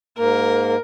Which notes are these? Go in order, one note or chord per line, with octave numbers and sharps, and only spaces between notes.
G#2 A#3 A#4